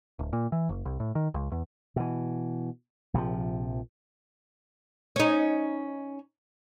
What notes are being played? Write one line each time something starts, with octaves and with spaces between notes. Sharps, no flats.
D1
A#2
E3
F#1
C2
A2
D#3
C#2
E2
B2 E3
A#1 C3 E3 F3
C#4 D#4